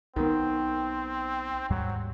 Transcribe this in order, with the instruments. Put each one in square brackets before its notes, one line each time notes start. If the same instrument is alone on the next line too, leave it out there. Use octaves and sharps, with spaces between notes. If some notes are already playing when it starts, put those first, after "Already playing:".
[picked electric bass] B1 B3 [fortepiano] D#3 [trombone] C4
[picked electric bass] D#2 G#2 G3 [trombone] F#3